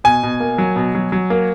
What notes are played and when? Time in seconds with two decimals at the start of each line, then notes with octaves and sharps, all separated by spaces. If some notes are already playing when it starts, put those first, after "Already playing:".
0.04 B2 G#5
0.23 B2
0.40 A#3
0.58 F#3
0.76 B2
0.95 F#3
1.12 F#3
1.30 A#3